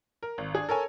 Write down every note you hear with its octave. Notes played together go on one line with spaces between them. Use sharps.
A#4
G#1
D4 G#4
A4 A#4 C#5 G#5